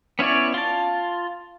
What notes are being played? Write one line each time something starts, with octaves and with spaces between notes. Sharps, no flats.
B3 C#4 E4 C#5 D5
F4 A5